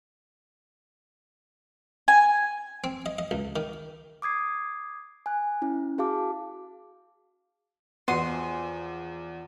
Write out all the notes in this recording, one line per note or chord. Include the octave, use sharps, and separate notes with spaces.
G#5
C4
D#5
D#5
C#2
D#3
D6 D#6 G#6 C7
G#5 F#6
C#4 E4
F#4 G#4 F5 A5 D6
E2 F3 G#3 B3 F#4 A#5 C6 D#7